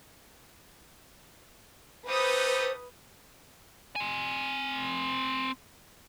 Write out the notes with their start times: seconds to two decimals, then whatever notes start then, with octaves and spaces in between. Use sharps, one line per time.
2.07 A3 D#4 G4 B4 C5 D#6
3.96 C4 G#5